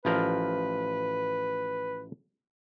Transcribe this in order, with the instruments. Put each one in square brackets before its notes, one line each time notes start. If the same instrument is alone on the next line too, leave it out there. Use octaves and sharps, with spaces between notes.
[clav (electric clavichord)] A1 F3 A#4 [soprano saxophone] B4